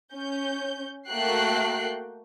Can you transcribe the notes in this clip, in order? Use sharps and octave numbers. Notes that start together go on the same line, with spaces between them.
C#4 G6
A3 A#3 F#4 G5 F#6 C7